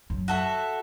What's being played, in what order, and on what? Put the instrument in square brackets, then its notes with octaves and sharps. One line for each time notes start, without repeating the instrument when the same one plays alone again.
[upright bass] F#2
[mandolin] F#4 A4 E5